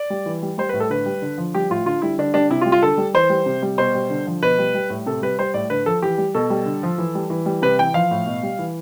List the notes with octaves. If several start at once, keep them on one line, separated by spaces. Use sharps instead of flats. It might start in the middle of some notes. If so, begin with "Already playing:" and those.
Already playing: D5
G3
E3
G3
G3 C5
B4
A2
A4
D3 B4
G3
D3
F3
G3 G4
A2 F4
D3 F4
G3 E4
D3 D4
G3 D4
C3 E4
F4
G3
F4
D3 A4
G3
E3 C5
G3
C3
G3
B2 C5
G3
D3
F3
B2 B4
G3
G3
A2
C3 A4
G3 B4
G3 C5
A2 D5
D3 B4
F3 A4
E3 G4
G3
B2 A4
G3
D3
F3
E3
G3
E3
G3
C3 B4
E3 G5
F3 F5
A2
B2
G3
E3